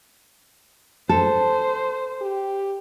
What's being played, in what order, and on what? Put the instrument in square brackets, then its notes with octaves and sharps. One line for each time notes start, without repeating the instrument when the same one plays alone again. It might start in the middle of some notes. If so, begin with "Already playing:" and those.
[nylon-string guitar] A4 [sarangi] C5
[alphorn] G4